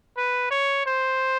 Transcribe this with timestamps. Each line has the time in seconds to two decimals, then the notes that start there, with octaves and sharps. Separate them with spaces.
0.17 B4
0.51 C#5
0.86 C5